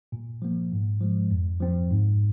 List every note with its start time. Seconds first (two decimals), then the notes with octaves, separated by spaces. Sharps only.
0.12 A#2
0.42 F3 A#3
0.72 G#2
1.01 F3 G#3
1.31 F2
1.60 F3 C4
1.90 G#2